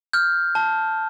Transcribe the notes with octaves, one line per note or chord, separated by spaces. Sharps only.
F6 G6
A5